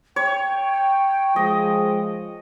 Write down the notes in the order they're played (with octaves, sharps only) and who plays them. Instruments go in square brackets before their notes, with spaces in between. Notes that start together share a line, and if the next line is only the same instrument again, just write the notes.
[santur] C#5 [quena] G5
[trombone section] F3 G#3 [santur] D#5